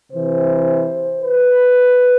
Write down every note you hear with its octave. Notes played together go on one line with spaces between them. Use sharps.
C3 E3 C5
B4